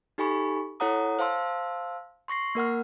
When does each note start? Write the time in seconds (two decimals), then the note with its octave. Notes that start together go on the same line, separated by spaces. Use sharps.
0.18 D#4 G4 A4 G#5 B5 C#6
0.80 E4 A4 C#5 F#5 A#5 D#6
1.19 C5 F5 A5 C6 E6
2.28 C6 C#6 A#6 C7
2.55 A#3 A#4 F#5 F6